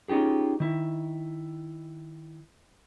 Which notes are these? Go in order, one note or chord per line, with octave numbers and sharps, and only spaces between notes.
C#4 D#4 F4 G4 G#4
D#3 E4